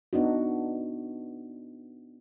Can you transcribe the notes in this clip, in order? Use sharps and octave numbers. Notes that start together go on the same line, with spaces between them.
B3 D4 D#4 F#4